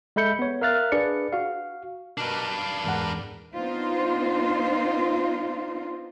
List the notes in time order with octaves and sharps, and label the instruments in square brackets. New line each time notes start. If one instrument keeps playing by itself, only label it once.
[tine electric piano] G#3 A4 E5 B5 G6 C#7
B3 C#5
A#4 E5 F5 F6 F#6 A6
D4 G#4 B4 D5 C#7
F#4 F5
[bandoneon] B2 A#4 D6 [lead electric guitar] D4 B4
[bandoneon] F5 D6
[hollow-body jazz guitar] E2 G#2 F#5 [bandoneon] A#4 D6
[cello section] B3 C4 D4 D#4 F4 C5